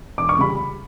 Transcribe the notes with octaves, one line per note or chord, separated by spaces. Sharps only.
E1 D6
C#6
C#3 G3 B5